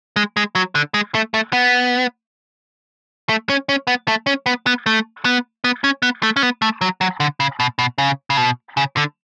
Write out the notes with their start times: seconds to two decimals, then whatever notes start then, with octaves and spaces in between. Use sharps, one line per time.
0.16 G#3
0.37 G#3
0.55 F#3
0.75 D3
0.94 G#3
1.15 A3
1.34 A3
1.53 B3
3.29 A3
3.49 C#4
3.69 C#4
3.87 B3
4.08 A3
4.26 C#4
4.46 B3
4.66 B3
4.86 A3
5.25 B3
5.64 B3
5.84 C#4
6.02 B3
6.23 A3
6.36 C#4
6.43 B3
6.62 A3
6.81 F#3
7.01 F#3
7.20 D3
7.40 C#3
7.60 B2
7.79 B2
7.98 C#3
8.30 C#3
8.37 B2
8.77 C#3
8.97 D3